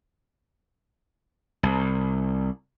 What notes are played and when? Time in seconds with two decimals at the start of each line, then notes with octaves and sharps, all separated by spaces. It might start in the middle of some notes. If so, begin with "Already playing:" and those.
1.63 C2